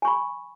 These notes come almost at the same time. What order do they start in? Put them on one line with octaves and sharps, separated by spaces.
G#5 C#6 B5